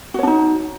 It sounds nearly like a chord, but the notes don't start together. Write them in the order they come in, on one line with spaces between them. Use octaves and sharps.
F#4 C#5 D4 D#4